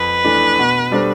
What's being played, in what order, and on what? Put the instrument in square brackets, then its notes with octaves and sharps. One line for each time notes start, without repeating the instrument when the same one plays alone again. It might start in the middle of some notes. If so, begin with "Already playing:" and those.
Already playing: [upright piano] F2 [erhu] B4
[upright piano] E3 A3 D4
B2
G3 D4 A4 C5